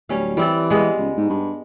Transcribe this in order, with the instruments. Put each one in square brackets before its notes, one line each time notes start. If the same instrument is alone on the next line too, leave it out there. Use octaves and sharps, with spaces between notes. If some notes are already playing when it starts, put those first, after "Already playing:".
[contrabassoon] D1 [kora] G3 C#4 F5
[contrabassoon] E3 [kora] G3 C4 D5
[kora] G3 G#3 B3
[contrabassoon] C#2
G#2
G2